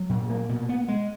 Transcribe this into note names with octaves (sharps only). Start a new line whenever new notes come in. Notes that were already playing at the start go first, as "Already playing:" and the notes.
Already playing: F#3
A#2
A#3
B2
B3
G#3